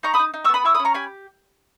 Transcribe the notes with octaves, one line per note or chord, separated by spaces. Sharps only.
D#4 A#5 C#6
B5 D#6
D#4
D#4
B3 C#6 E6
B5 D#6
E4 C#6 E6
B5 D#6
C#4
A#5 C#6
G4 G#5 B5